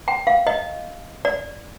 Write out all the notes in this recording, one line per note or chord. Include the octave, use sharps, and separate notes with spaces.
G5
F5
D#5
D5